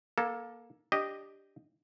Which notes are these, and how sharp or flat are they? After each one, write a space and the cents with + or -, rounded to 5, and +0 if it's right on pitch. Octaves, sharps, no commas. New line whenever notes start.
A#3 +20 A4 +0
D4 +0 G4 +5 D#5 -5